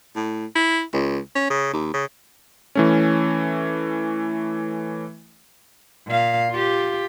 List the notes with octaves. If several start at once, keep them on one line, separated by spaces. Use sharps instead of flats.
A2
E4
C#2
C#4
C#3
D#2
C#3
E3 A3 C#4
A#2 F5
F4 G4